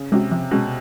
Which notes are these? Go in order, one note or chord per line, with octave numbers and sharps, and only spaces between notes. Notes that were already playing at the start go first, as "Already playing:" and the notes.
Already playing: C#3
C3 G#3 C#4 F#4
C3 F3
B2 G#3 C#4 F#4